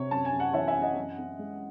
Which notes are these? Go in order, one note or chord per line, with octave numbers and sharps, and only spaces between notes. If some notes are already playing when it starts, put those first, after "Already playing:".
Already playing: C3 C#5
F#2 A5
G#5
F#2
F#5
E3 C#5 E5
E5 G#5
F#2
D#5 F#5
F#2
C#4
G#3